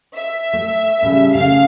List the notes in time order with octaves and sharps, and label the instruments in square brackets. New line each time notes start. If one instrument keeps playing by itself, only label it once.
[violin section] E5
[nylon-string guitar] A3
A2 C#3 G3
[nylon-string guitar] C#3 A3 [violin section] F5